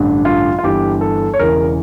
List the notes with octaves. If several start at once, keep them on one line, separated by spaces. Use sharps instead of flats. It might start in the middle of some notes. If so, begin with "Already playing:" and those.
Already playing: A1 G2 D3
F4
F4
G1 G2 E3 G4
A4
C#5
E1 E2 C#3 E3 A#4